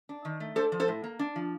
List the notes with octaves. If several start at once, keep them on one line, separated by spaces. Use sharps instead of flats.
D4
D#3
A3
D4 A4 C5
F3
A4 C5
A2
A#3
D4
F3